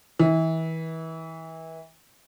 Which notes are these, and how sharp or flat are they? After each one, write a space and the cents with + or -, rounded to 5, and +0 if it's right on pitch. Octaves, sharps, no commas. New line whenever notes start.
E3 -30